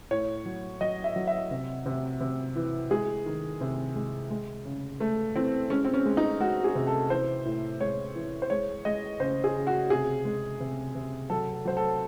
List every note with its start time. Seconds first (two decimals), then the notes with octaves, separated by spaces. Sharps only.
0.11 A2 C#5
0.46 F#3
0.81 F#3 D#5
1.04 E5
1.16 F#3
1.27 E5
1.51 C3
1.86 C3
2.21 C3
2.56 E3
2.91 G#3 G#4
3.26 D#3
3.61 C3
3.95 G#3
4.30 G#3
4.65 C#3
5.00 G#3 A3
5.35 E3 C4
5.70 G#3 C#4
5.85 C4
5.94 C#4
6.05 G#3
6.17 D#4
6.40 G#3 F#4
6.64 G#4
6.75 C3
6.87 A4
7.10 E3 C5
7.45 A2
7.81 G#3 C#5
8.15 E3
8.42 C5
8.50 G#3 C#5
8.85 G#3 D#5
9.20 C#3 C5
9.44 G#4
9.55 C#3
9.67 F#4
9.90 C3 G#4
10.25 G#3
10.60 C3
10.95 C3
11.30 F#3 A4
11.53 A4
11.65 F#3 C5
11.77 A4